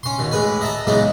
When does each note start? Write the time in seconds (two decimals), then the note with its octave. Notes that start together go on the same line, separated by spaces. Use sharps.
0.03 C#4 C6
0.18 D#2 B2
0.31 A1 G#3 B4 G#5
0.61 D#5 E5 A5 A#5
0.87 C#3 E3 F#3 G#3 B3 D#4